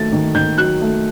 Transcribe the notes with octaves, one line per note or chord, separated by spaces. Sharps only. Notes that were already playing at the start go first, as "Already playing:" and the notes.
Already playing: D#3 F#3 A3 A6
D#3
D#3 G6
F#3 F#6
A3